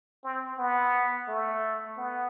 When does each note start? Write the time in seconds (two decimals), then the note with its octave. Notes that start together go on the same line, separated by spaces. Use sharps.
0.24 C4
0.58 B3
1.28 A3
1.98 B3